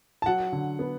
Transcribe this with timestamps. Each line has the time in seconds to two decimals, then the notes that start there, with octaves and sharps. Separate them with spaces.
0.22 A5
0.26 F#3 F#5
0.52 D3
0.79 B3